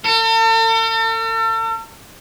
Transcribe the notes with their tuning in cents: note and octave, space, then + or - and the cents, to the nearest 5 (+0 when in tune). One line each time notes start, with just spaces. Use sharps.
A4 +45